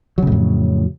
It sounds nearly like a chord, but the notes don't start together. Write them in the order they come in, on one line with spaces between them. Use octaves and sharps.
F#3 C#3 A2 F2